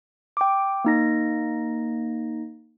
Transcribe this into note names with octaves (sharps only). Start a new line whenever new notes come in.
G5 D6
A#3 D#4 A#6